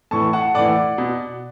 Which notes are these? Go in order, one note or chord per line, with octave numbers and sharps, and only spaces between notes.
A2 E3 A5 C#6
F#5 A5
A2 E3 D5 F#5
B2